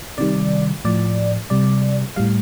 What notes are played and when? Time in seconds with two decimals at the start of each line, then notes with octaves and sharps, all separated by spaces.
0.18 C3 D#3 G3 D5
0.85 A2 F3 D5
1.50 C3 G3 D5
2.16 A2 G3 F5